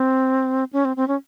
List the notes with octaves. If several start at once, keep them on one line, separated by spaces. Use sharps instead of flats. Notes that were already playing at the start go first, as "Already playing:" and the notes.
Already playing: C4
C#4
C4
C4
C#4